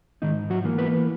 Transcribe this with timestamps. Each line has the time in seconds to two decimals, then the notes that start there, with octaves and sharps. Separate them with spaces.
0.22 G#2 D#3 D#4
0.50 F#3 F#4
0.64 E3 A#3
0.78 B3 B4